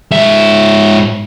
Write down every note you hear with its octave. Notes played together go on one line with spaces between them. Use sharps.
G#2 E5